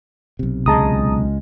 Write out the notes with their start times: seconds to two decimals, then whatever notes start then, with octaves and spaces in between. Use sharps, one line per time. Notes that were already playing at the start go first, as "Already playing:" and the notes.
0.39 B1 C3
0.66 C#2 G#3 A5 A#5 D#6